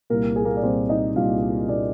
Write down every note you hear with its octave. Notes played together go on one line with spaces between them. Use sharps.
C2 A#2 A#3 A#4
G#4
A#3 A#4
D5
C2 A#2 C4 C5
D#4 D#5
C2 A#2 F4 F5
A#2 D4 D5